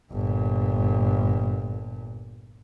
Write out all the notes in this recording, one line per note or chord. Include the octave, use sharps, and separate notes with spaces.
G1 A#2